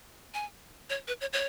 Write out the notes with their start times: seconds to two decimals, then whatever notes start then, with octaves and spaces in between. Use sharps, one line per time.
0.34 G#5
0.90 C#5
1.08 B4
1.21 C#5
1.33 C#5